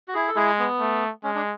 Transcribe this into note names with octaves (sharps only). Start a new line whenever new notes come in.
F#4
E4 G#4
A4
G#3 E4 G#4
B3
A3
G#3 C#4
D4